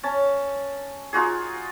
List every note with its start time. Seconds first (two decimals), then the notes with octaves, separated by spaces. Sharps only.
0.03 C#4 A5
1.13 D#4 F4 F#4 G#4